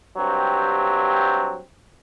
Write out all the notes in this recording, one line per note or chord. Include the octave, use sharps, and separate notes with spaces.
G2 F#3 C4 G4